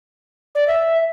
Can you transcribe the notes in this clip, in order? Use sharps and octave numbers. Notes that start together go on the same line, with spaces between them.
D5
E5